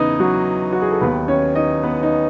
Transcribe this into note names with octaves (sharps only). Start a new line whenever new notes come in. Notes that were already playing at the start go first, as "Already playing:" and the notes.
Already playing: E2 C#3 E3 B3 D#4 E4 B4 D#5
F#3 F#4
F#4
G#4
A4
D#2 D#3 B3 B4
C#4 C#5
D#4 D#5
B3 B4
D#4 D#5